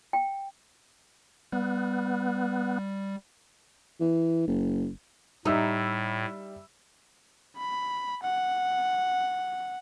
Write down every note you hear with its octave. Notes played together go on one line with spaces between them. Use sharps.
G5
G3 B3
E3
F#1
A2 G3 D#4 E5 E6
B5
F#5